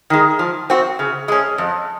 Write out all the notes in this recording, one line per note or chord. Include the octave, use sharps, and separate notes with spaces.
D#3 G#3
F3
C4 F#4
C#3
G#3 C#4
F2